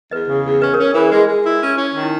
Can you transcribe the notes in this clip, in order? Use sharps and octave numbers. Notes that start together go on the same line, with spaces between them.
E2 B4 D#5
C#3
E2
C#4 B4 D#5
A#4 C#5
C#4
A#4
E3 G#4
G#3 B4
G#3
E4
C#4
C#4
D#3
E4